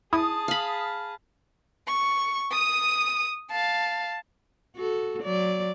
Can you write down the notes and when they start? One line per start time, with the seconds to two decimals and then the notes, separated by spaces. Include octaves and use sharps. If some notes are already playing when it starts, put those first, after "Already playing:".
0.13 E4 G#4 A5 D#6
0.48 F5 B5
1.88 C#6
2.52 D#6 D#7
3.50 F5 A5
4.76 F#4 A4
5.23 F#3 D5